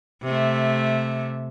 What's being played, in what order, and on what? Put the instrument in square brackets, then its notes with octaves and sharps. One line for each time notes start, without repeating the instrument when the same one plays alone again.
[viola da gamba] C3 A3